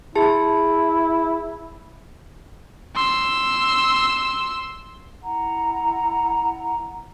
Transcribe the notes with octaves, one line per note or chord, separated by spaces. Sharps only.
E4 G#4 A5
C6 E6
E4 F#5 A#5